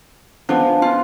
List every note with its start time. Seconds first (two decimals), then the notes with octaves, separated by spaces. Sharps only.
0.49 F3 G#3 B3 D4
0.82 F4